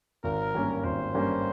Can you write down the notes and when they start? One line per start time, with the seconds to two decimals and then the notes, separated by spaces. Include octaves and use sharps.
0.24 G#1 A#4
0.54 G2 G3 A#3 C#4
0.84 G#1 C5
1.14 G2 G3 A#3 C#4